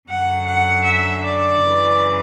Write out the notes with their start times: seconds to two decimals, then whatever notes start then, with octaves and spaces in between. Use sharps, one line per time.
0.09 F#2 D3 F#5
0.47 F#5
0.85 E5
1.24 D5
1.63 F#2 C#3 E3